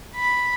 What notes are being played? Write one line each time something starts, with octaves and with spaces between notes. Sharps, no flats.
B5